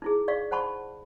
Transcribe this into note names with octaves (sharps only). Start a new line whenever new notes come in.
D#4 E4 G#4
D5 F5 C#6
C5 F#5 A5 B5 C#6